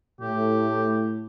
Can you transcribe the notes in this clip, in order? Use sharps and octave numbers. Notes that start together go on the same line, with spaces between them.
A2 G4